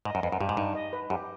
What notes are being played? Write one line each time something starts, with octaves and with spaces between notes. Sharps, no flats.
G#2 D#5
F#2
F2 B4
F#2
G2 G4
G#2
G2 D#4
D#5
B4
F#2 G4